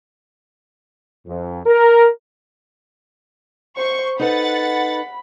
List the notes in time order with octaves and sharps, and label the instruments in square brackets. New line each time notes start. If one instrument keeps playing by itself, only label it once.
[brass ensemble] F2
A#4
[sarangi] C5 [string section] C#6
[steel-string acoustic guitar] D#4 A4 B4 [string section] F#5 A6 [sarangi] B5